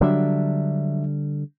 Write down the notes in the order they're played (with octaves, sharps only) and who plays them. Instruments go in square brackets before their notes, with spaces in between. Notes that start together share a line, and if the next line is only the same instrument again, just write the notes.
[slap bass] D3 G3 [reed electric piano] F#3 D4 E5